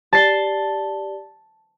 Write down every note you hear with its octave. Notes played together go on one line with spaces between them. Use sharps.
G4 D5 A5 C7 G7